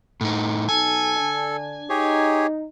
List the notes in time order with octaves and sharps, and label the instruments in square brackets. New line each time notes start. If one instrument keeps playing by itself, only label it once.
[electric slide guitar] A2 D#4
[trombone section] B1 D#4 [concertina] A4 [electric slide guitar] G#5
[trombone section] D3 D4
[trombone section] D#4 [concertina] G4 G#4 C#5